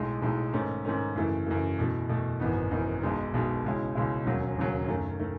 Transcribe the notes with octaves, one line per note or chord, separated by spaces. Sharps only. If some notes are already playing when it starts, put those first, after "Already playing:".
Already playing: B1 A2 G#3 D#4
B1 A2 G#3 D#4
G#2 D#3 A3 C#4
G#2 D#3 A3 C#4
F#2 C#3 E3 A3
F#2 C#3 E3 A3
E2 B2 A3
E2 B2 A3
G#1 F#2 E3 B3 D#4
G#1 F#2 E3 B3 D#4
B1 B2 G#3 D#4
B1 B2 G#3 D#4
C#2 B2 G#3 C#4 E4
C#2 B2 G#3 C#4 E4
E1 D#2 C#3 F#3
E1 D#2 C#3 F#3
F#2 D#3 A3
D#3 A3